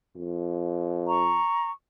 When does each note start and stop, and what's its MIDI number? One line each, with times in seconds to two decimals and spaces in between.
0.16 1.41 41
1.07 1.71 82
1.07 1.71 85